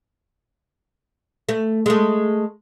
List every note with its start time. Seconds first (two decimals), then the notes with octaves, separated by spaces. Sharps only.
1.49 A3
1.86 G#3 A3